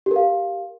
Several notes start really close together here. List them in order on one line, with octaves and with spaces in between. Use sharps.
G4 A#4 F5